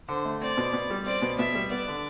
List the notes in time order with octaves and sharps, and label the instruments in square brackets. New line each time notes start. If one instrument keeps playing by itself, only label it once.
[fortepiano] D3 [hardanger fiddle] C5
[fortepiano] A3
[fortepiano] C4 [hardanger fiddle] D5
[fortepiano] B2
B2
G3
[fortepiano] C4 [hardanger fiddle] D5
[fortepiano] B2
[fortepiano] B2 [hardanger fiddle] E5
[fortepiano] G3
[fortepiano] B3 [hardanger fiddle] D5
[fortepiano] D3